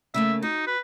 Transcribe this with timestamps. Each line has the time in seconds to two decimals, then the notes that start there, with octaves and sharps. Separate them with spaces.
0.14 C#3 A3 A#3 E5
0.43 D#4 F#4
0.67 B4